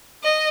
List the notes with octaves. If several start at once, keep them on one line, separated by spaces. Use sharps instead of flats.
D#5